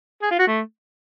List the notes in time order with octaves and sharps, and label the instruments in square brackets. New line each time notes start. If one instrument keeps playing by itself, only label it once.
[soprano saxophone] G#4
F4
F#4
A3